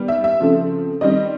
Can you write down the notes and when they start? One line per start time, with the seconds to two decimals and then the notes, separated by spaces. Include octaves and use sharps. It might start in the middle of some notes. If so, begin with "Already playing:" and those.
Already playing: D#3 G3 B3
0.08 E5
0.24 E5
0.40 C#3 F3 A3 C4
1.01 D#3 G3 C4 D#5